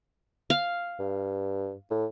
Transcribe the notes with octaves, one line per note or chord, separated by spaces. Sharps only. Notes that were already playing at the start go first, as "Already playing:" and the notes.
F5
G2
A2